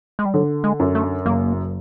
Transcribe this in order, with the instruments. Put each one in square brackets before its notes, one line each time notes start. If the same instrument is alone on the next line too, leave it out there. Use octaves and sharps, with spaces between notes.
[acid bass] G#3
G3
[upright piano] D3 [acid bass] F#3
[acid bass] G#3
[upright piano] F#2
[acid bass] A3
[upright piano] F#1 [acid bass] A#3